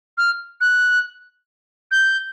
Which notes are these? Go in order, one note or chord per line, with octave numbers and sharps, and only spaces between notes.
F6
F#6
G6